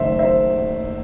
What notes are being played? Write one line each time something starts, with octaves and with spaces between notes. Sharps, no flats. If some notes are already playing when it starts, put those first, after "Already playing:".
Already playing: F#1 F#2 D#3 A3 C5 E5
C5 E5